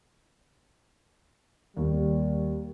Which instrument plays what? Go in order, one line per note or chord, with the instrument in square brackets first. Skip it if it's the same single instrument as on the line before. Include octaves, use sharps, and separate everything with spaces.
[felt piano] D#2 [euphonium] G3